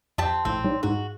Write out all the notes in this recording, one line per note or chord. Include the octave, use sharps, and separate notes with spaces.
F2 C4 G4 A5
A#1 A2 C4
G3 D#4 C#5
G#2 D#4 F#4 G#4